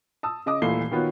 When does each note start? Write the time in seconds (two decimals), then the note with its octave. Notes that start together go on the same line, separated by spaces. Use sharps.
0.23 A5 D#6 E6
0.46 C#3 D#5 D6 D#6
0.62 D#1 A#2 E3 A3 C7 G7
0.91 D#3 B3 F4 F#4 C#5